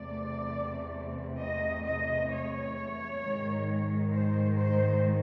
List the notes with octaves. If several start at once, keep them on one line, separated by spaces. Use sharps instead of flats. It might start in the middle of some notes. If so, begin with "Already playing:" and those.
Already playing: E2 C3 E3 A3 C4 D5
D#5
D#5
C#5
G#2 D#3 G#3
C5
C5